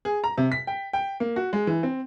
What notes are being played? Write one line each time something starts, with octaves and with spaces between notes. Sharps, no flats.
G#4
A#5
C3
B6
G5
G5
A#3
F#4
G#3
E3
C4